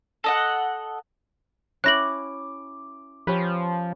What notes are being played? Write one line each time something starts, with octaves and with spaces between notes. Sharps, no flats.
A4 D#5 F#5
C#4 E4 G5 D6 F#6 A#6 F#7
F3 C#4 G4 B4